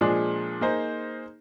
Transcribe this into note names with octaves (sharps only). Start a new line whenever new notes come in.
A#2 F3 G#3 D4 G#4
A#3 D#4 G#4 C5